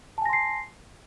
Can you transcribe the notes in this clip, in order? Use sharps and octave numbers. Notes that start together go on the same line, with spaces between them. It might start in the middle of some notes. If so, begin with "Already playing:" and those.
G#5 A5 C6 A#6 C7